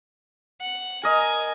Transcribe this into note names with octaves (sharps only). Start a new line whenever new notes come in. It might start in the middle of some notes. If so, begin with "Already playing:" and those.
F#5
A#4 D#5 G#5